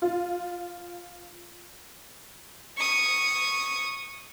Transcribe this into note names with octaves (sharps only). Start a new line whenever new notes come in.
F4
C#6 D#6